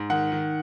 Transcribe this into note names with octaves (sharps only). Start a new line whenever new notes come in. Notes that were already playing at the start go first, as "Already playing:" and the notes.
Already playing: G#2
D#3 F#5
D#3